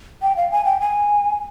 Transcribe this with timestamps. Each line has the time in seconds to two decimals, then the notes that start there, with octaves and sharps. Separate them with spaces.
0.22 G5
0.37 F5
0.52 G#5
0.65 G5
0.80 G#5